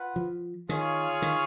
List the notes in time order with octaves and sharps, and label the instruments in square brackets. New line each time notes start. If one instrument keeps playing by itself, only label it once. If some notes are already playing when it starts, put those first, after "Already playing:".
Already playing: [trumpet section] F4 B4 F#5
[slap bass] F3
[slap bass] D#3 [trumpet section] F4 G#4 C#5 F5
[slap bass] D#3